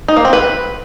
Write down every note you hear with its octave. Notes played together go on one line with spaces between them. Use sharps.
D#4
A#3
C4
B4